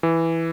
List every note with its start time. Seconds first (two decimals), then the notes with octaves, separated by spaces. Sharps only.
0.03 E3